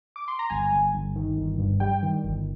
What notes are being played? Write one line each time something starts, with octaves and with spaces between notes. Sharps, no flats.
D6
C6
A#5
G1 G#5
G1
G1
D#3
G1
G2
G3 G5
D#3
G1